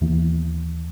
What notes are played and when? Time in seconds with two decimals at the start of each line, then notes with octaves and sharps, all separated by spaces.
0.01 D#2 E3 A#3 B3